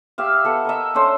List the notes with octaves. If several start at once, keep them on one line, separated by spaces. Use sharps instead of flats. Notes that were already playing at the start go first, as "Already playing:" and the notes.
G4 E5 F5
B3 A4 F#5
A#4 D#5 E5
C#4 D4 A4 C5